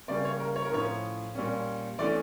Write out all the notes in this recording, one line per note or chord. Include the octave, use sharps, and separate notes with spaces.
C#3 G3 A#3 C#4 D5
C#5
A#4
C#5
A#4
A2 F3 A3 C#4 C#5
A#2 G3 C#4
E3 A3 C#4 D5